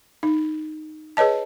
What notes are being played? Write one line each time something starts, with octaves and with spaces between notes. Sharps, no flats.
D#4
G#4 B4 C#5 D#5 A5